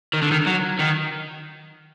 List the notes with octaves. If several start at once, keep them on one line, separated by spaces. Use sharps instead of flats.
D#3
D3
D#3
F#3
D#3